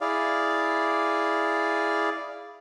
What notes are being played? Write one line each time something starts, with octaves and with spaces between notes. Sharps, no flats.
E4 G#4 D5 F5